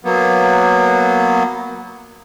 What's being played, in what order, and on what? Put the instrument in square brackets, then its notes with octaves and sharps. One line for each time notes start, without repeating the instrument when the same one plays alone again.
[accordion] F#3 A#3 B3